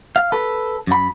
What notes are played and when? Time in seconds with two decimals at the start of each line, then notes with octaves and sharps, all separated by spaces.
0.16 F5
0.32 A4 B4
0.87 F#2 B5